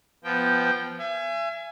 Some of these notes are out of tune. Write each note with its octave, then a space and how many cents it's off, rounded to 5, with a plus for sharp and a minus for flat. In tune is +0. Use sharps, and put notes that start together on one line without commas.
F3 -10 B3 +0 G5 +0
E5 +40 G#5 +0